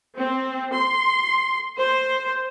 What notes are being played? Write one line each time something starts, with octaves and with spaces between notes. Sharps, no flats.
C4
C6
C5